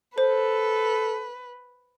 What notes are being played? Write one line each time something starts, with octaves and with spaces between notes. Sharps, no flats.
A4 B4 C5